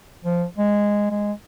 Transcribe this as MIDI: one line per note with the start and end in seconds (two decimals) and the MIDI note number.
0.25 0.45 53
0.58 1.07 56
1.10 1.32 56